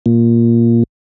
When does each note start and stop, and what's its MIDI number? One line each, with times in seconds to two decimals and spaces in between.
0.06 0.83 46